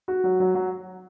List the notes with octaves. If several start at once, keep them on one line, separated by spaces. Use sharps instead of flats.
F#4
F#3
F#3
F#3